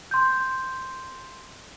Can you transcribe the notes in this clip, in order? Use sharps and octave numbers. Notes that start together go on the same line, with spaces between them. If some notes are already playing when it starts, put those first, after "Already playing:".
C6 G6